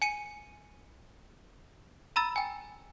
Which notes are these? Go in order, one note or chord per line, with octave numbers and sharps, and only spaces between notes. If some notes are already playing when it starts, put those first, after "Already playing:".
G#5 C#7 D#7
A#5 B5 E6 A6
G5 G#5